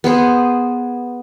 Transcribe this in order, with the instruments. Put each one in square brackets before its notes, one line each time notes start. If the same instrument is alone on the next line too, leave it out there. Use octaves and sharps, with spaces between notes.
[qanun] B3 G#4 C5